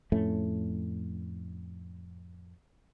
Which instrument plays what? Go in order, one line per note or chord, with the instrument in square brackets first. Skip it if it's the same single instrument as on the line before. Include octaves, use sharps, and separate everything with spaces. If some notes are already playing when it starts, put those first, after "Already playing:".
[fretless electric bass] F2 A2 A3 C#4